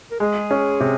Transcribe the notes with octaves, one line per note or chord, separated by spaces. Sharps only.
A#4
G#3 G#4
C#4
C3